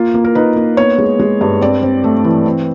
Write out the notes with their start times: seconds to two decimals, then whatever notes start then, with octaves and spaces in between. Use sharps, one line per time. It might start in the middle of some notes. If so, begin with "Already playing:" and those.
Already playing: A#3 F4
0.14 A#3
0.25 A#4
0.35 D#4 B4
0.56 A#3
0.77 B3 C#5
0.98 G#3
1.20 G#3
1.41 G2
1.61 C4 D5
1.83 C4
2.04 A3
2.24 E3
2.46 C4